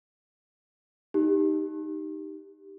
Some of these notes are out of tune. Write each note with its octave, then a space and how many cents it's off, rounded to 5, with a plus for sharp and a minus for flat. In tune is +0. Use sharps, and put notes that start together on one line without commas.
D#4 +0 G4 +0